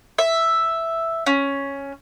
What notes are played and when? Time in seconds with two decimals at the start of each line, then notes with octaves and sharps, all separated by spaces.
0.18 E5
1.26 C#4